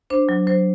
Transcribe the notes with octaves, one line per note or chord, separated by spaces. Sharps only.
D4 C5
F#3
F#3 C5